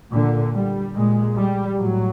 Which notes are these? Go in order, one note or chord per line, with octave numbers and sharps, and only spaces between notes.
A#2 D3
G3
A#2 G#3
G3
A2 F#3